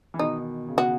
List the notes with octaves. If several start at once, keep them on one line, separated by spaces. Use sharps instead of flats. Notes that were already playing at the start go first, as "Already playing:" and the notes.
E3
B2 D#3 D#4
C#3
B2 F#4